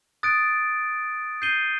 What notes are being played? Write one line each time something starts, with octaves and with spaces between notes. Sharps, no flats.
D#6 F#6 A6 D7
G6 C7 D#7 G7